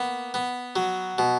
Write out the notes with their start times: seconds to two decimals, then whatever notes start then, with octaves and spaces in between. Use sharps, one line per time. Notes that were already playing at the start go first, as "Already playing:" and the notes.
Already playing: A#3 B3
0.34 B3
0.76 F#3
1.18 B2